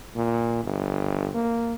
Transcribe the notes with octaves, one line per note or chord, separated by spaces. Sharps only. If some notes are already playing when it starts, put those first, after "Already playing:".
A#2
G1
A#3